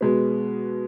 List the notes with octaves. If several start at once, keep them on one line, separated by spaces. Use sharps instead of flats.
B2 G#3 B3